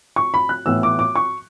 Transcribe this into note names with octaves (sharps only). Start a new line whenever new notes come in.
C#6
B5
F#6
A2 E3 B3 E6
D6
D6
C#6